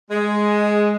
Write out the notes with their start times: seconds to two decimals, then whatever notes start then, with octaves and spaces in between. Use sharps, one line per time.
0.11 G#3